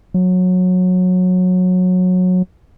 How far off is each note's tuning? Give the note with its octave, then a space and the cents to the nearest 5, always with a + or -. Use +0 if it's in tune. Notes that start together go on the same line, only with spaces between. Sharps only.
F#3 -20